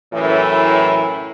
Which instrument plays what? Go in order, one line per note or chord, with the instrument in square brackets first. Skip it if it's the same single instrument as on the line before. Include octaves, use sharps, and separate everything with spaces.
[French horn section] F#2 A2 E3